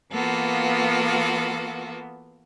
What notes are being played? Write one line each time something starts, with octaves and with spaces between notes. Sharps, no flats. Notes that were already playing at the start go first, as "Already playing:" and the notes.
E3 A#3 B3 F4 F#4 A4